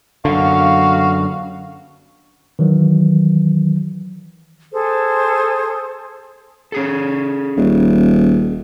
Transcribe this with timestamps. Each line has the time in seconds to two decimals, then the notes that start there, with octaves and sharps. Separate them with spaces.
0.25 F#2 D3 F#4 F5
2.59 D#3 E3 F#3
4.72 G#4 A4 C5
6.72 C#4 G#4 A4
7.57 D#1